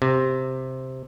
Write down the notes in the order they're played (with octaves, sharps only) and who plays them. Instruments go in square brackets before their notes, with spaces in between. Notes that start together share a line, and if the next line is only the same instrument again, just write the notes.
[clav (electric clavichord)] C3